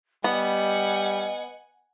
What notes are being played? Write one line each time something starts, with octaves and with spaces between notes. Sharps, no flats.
G3 B3 D#5 F#5 G#5